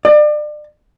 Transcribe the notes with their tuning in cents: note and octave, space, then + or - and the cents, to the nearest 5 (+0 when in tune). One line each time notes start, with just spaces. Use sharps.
D5 +35